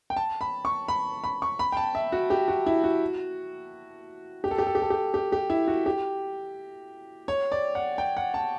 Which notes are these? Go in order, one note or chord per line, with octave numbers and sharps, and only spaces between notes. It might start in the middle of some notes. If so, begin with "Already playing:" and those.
G5
A5
B5
C#6
B5
B5
C#6
B5
G5
A5
E5
F#4
G4
F#4
E4
F#4
G4
A4
G4
A4
G4
A4
G4
G4
G4
E4
F#4
G4
C#5
D5
F#5
G5
F#5
A5